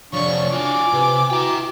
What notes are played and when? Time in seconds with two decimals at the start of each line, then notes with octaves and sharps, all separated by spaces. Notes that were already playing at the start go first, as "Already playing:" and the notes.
0.13 C3 F3 D4 C#5 C#6
0.53 F4 F#4 G#5 D6
0.93 C3 B4
1.30 E4 F#4 G5 A#5